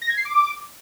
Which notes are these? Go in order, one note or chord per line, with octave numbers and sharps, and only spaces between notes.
A#6
G#6
C7
D6